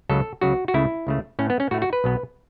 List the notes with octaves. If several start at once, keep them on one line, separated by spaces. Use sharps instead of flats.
C#2 C#3 F#3 A4
C#2 C#3 F#3 F#4
F#4
C#2 C#3 A3 E4
C#2 C#3 A3
A2 A3 C#4
B3
C#4
A2 A3 F#4
F#4
B4
B1 B2 B3